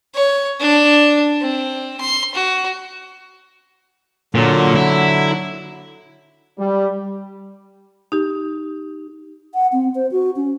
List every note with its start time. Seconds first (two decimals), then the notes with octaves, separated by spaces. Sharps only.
0.14 C#5
0.60 D4
1.41 C4
2.00 C6
2.35 F#4
4.35 A#2 D3 F#3
4.76 E4
6.59 G3
8.12 D#4 G4
9.54 F#5
9.73 C4
9.95 C5
10.12 F#4
10.36 C#4